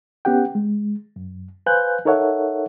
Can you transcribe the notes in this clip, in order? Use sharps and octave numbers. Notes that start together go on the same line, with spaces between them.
B3 C#4 G4 F#5 G5
G#3
F#2
B4 C5 F5 G#5 F#6 G6
D#4 A4 A#4 C#5 E5 F#5